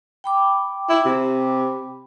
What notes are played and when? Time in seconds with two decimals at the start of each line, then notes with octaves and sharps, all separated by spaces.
0.24 G5 B5 D6
0.89 E4
1.05 C3